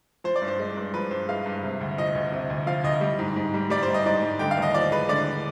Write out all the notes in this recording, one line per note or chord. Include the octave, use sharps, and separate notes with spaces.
F3 C5
D5
G2
C5
G#3
G2
F3 B4
G2 C5
G#3 F5
G2
C3
D2
F3 D#5
D2
C3
D2
F3 F5
D2 D#5
G3
G#2
G#2
G3
G3 D5
C5
G#2
D#5
G#2 D5
G3
D3 G5
F5
D#2 D#5
F3 D5
G#3 B4
D3 D5